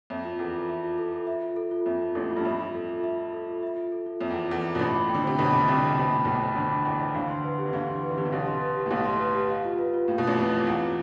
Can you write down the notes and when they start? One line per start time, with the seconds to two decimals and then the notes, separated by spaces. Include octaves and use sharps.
0.10 F2 E5
0.25 F4
0.39 E2 A4
0.54 F4
0.69 E5
0.84 F4
0.98 A4
1.12 F4
1.27 E5
1.42 F4
1.56 A4
1.71 F4
1.86 F2 E5
2.01 F4
2.15 A1 A2 A4
2.31 F4
2.37 G2
2.45 F2 E5
2.60 F4
2.74 A4
2.89 F4
3.04 E5
3.18 F4
3.33 A4
3.48 F4
3.63 E5
3.77 F4
3.92 A4
4.06 F4
4.21 F2 E5
4.31 E2
4.36 F4
4.51 E2 A4
4.65 F4
4.75 B2
4.79 A1 A2 B5
4.95 D6
5.09 G5
5.15 D3
5.24 C3 C5
5.38 B1 B2 B5
5.53 D6
5.61 D3
5.68 C2 C3 G5
5.83 C5
5.97 B2 B5
6.10 A2 D6
6.25 B1 B2 G5
6.42 C5
6.55 D2 D3 B5
6.71 D6
6.85 E2 E3 G5
7.00 C5
7.14 D2 D3 F5
7.30 C6
7.44 B4
7.58 G4
7.65 E3
7.73 D2 D3 F5
7.88 C6
8.03 B4
8.11 E3
8.17 D3 G4
8.25 C3
8.32 B1 B2 F5
8.47 C6
8.62 B4
8.76 G4
8.86 A2
8.91 B1 B2 F5
9.05 C6
9.20 B4
9.35 G4
9.50 F5
9.65 F4
9.78 B4
9.94 F4
10.08 A2 F5
10.18 B2
10.23 A1 A2 F4
10.37 F2 B4
10.53 F2 F4
10.67 E2 F5
10.82 F4